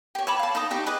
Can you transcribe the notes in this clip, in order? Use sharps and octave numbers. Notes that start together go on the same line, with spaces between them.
G4 C#5
C#5 A5 B5 D6
F5 A5
D#4 A5 A#5 D#6
D#4 G4 G5 C#6
G#4 B4 D#5 D6